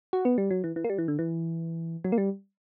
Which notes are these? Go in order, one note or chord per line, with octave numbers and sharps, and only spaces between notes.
F#4
B3
G3
F#3
E3
E3
A#3
G3
E3
D3
E3
F#3
A#3
G3